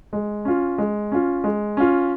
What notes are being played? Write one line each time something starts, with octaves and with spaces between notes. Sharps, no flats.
G#3
C#4 F4
G#3
C#4 F4
G#3
C#4 F4